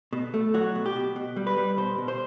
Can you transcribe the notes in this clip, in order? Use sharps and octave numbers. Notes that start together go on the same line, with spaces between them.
B2
A3
F#3 F#4
B2
G4
B2
B2
G3
B4
G3
B2 C5
B2
C5